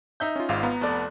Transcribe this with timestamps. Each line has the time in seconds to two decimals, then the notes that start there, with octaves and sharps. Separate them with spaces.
0.20 D#4 E5 G6
0.36 C#4 F4
0.49 G#1 G#2 F4 F5
0.63 B3 A#5
0.81 F1 A4 D5